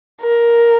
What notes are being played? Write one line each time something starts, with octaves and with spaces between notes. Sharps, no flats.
A#4